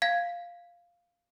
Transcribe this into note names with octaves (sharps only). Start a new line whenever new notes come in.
F5 G#6 B6